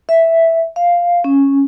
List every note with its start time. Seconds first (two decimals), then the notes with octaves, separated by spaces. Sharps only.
0.09 E5
0.76 F5
1.24 C#4